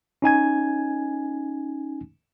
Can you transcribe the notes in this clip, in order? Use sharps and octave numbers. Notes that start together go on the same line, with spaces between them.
C#4 D#4 G#5 G#6